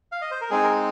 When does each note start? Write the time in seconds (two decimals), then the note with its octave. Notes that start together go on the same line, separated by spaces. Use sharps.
0.12 F5
0.21 D#5
0.31 C5
0.41 A#4
0.50 G#3 C4 D#4 G#4
0.63 A#4